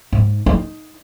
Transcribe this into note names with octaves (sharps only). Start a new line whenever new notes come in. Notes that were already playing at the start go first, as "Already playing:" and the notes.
G#2
D#4